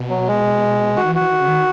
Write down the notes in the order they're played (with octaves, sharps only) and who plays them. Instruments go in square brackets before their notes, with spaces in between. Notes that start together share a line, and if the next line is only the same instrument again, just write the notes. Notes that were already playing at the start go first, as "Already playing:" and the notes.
Already playing: [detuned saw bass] B2
[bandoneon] F#3
G#3
[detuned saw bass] D#3 [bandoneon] F#4
[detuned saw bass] E3
[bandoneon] F#4
[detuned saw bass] E3
D#3
C#3
D#3